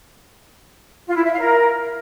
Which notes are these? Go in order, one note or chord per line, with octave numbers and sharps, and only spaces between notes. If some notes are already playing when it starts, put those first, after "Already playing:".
F4
E4
E5
F5
A#4